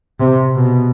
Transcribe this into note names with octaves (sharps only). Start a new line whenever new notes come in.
C3
B2